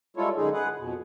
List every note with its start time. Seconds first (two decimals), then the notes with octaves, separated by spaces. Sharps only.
0.17 G3 G#3 E4 F4 A4 C#5
0.36 F#2 D3 G#3 D#4 G#4
0.53 G#4 B4 F#5
0.78 F2 B2